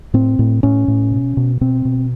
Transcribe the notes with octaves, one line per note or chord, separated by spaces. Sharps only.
A2 C4
A2
A2 C#4
A2
B2
B2
B2 C4
B2